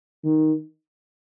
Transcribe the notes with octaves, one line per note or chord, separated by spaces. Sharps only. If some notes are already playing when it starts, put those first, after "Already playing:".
D#3